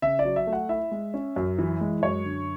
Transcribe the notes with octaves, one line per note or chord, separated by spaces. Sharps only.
C#3 E5
D5
F#3
E5
A3
F#5
E4 E5
G#3
C#4
F#2
E3
G#3
F#2 C#5
D3